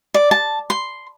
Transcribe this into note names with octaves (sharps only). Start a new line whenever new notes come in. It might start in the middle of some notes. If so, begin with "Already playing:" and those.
D5
A5
C6